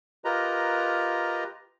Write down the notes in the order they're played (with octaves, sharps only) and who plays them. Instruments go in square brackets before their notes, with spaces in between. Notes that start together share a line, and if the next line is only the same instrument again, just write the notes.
[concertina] F4 G4 A#4 B4 D#5 A#5